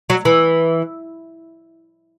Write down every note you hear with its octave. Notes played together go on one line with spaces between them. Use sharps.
F#3
E3